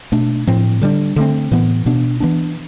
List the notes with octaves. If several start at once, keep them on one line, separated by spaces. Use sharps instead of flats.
B2 A3 D4
A2 F3 C4
D3 G3 D4
D3 A3 C4
A2 E3 B3
B2 B3 D4
E3 B3 D4